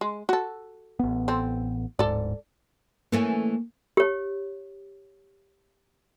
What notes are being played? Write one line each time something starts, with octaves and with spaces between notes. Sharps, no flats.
G#3
F#4 A4
A1 B3
C4 A4
D1 G1 G#2 A4 D5
E3 A3 A#3 C#4
G4 C#5